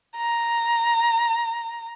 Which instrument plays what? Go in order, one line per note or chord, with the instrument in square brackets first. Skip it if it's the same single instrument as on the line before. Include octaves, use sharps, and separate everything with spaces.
[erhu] A#5